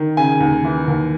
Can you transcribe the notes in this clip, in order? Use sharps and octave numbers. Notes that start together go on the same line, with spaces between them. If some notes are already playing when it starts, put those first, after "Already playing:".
Already playing: D#3
C#3 G#5
D#2
E3
D#2